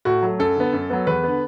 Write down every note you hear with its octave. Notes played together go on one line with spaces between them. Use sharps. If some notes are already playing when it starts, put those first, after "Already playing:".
A2 F#4
F#3 A3
F#2 A4
D3 B3
F#2
F#3 B3
E2 B4
D3 B3